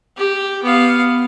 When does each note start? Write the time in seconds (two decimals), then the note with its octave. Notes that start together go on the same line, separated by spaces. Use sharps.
0.17 G4
0.63 B3 F5